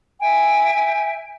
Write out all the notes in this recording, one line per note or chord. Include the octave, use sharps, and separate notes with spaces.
E5 G5 G#5